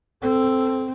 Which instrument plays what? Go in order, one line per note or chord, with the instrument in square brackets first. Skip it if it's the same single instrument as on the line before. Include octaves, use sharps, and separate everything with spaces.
[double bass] C4 [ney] A4